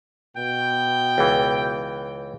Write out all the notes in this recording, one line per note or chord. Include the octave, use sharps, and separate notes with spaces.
B2 G5
C#2 E3